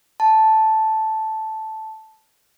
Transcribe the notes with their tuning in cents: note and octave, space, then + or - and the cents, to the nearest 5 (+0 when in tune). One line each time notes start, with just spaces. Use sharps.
A5 -5